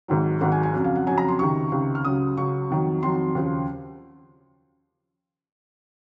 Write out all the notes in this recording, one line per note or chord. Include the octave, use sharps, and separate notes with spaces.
G#1 G#2 D#3 F#3
G#1 G#2 D#3 F#3 F#5
G#5
G#5
F2 C#3 F#3
F5
F#5
F2 C#3 F#3 G#5
A#5
C6
C#2 C3 D#3 C#6
C#2 C3 D#3
F6
C#2 C#3 F#3 D#6
C#2 C#3 F#3 C#6
F2 D#3 F#3
F2 D#3 F#3 C6
D#2 C#3 F3